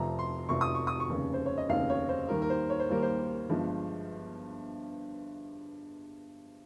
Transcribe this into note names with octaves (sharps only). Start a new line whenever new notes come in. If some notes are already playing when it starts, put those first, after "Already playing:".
Already playing: F1 F2 C3 F3 A#5
C6
F1 F2 C3 F3 C#6
D#6
C#6
D#6
C#6
F1 D#2 C#3
C5
C#5
D#5
F1 D#2 C#3 F5
C#5
C5
D#2 D#3 G3 A#3 A#4
A#4
C5
C#5
C5
D#2 D#3 G3 A#3 A#4
C5
G1 G2 F3 G#3